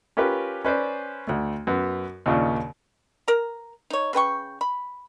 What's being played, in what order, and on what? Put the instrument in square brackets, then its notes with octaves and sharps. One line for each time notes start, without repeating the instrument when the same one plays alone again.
[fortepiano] C#4 F4 G4 A#4 B4
C#4 B4 C5 D5
D2 A3
F#2 B3
D#2 A#2 C#3 D4
[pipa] A#4 A#5
D#4 C#5
C#3 B4 G5 C#6
B5